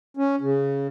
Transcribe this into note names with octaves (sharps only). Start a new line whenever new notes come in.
C#4
C#3